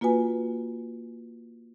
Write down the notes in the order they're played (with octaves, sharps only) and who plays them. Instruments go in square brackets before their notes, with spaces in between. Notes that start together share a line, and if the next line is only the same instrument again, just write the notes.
[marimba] A#3 F4 F#4 B4 G#5